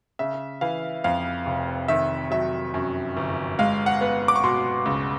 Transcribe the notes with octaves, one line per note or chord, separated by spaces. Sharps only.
C#3 E5
E3 F5
F2 F5
F1
D#3 E5
F#3 E5
F#2
G1
G#3 F5
F#5
B3
D6
C#6
B2 C6
C#2